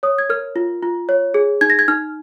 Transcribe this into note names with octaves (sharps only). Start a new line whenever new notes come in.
C#5 D#6
G#6
A#4 F6
F4
F4
C#5
G#4
D#4 G#6
A#6
G#6
D#4 F6